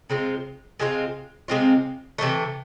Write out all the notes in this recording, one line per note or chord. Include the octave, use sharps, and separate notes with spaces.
C3 G#3 C4 F4
C3 G#3 C4 F4
C3 G#3 C4 F4
C3 E3 A3